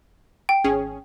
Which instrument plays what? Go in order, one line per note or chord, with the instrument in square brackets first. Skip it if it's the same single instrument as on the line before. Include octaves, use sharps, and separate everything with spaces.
[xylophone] G5
[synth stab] G#1 C#4 G#4